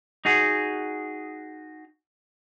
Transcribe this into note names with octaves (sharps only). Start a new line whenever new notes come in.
D#4 F#4 G#4 F#5